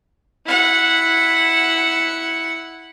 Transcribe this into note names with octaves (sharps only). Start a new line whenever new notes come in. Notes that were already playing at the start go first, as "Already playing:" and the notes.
E4 F#5